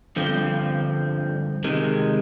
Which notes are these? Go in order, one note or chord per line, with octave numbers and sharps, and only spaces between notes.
G2 D3 F3 C4
C3 D#3 G#3